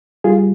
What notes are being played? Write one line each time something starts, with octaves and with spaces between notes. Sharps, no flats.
G3 F4 G#4